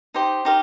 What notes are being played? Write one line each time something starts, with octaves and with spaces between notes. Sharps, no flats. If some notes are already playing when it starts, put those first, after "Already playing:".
D#4 G4 C5
D#4 G4 A#4